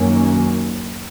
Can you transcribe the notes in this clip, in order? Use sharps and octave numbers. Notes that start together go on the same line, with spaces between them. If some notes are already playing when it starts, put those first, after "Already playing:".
Already playing: F#2 D#3 F#3 A#3 C#4